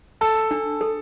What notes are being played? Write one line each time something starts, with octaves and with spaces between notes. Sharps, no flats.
A4 A5
D4
A4